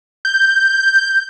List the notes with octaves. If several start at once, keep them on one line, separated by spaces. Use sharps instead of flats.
G6